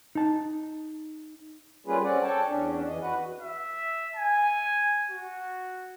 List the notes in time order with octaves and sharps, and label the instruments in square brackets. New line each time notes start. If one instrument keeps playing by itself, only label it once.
[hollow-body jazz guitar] D#4 A5
[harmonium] G3 A#3 C#4 F4 G#4 B4
C4 C#4 D5 F#5
A4 C#5 G5 A5
E2 C#4 D4
F2 E3 D#5
F#4 B4 F#5
[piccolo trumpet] E5
G#5
F#4